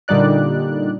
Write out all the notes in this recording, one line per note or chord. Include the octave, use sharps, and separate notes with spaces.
A#2 D3 G3 D#4 D5 F#6